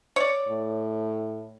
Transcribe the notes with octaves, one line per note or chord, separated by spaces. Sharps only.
C#5 D5
A2